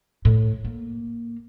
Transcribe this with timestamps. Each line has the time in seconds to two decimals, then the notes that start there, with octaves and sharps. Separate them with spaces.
0.25 A2
0.65 A#3